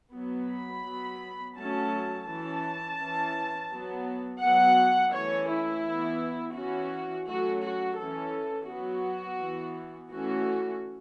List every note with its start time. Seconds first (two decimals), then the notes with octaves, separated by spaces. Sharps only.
0.14 F#3 B3
0.49 B5
0.85 F#3 B3
1.56 F#3 A3 C#4 A5
2.27 E3 C#4 A5
2.98 E3 C#4
3.70 F#3 B3
4.41 F#3 B3 F#5
5.12 E3 A3 C#4 C#5
5.48 E4
5.84 E3 B3
6.55 E3 C#4 F#4
7.26 F#3 A3 C#4 F#4
7.62 F#4
7.97 E3 C#4 A4
8.69 F#3 B3 F#4
9.40 E3 B3
10.11 E3 A3 C#4 F#4